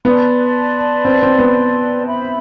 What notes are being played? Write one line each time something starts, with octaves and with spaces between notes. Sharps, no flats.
B3 B4 D5 A5 C6
C4
C4
B3
C5 E5 B5